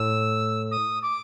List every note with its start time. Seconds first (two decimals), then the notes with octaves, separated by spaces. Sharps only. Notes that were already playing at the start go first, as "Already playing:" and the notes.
Already playing: A2 E6
0.71 D#6
1.02 D6